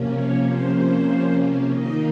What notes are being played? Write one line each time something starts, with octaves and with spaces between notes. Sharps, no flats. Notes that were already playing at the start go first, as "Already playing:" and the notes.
Already playing: C3 F3 A#3 C#4
C#5
C5
D#3 A#3 D#4 D#5